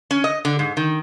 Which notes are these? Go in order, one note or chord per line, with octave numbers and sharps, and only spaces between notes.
C#4
D#5
D3
G#2
D#3